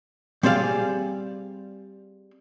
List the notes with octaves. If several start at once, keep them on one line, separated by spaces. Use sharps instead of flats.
G3 C4 G#4 D5 F5